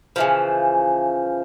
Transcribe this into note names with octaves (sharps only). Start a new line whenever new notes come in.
C#3 E3 F3